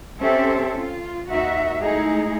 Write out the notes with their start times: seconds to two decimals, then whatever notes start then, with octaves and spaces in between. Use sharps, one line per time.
0.21 C4 C#4 G4 A4 C5 E5
0.77 F4
1.31 D#2 D#4 F#4 E5
1.81 G#3 A3 D#4 E4 G#4